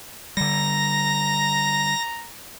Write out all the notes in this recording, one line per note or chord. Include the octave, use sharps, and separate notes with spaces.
D3 G3 A#5 A#6